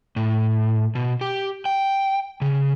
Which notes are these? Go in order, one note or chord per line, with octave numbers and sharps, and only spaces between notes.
A2
B2
G4
G5
C#3